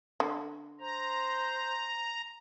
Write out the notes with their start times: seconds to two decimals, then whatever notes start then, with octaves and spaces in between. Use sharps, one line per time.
0.20 D3
0.81 C5 A#5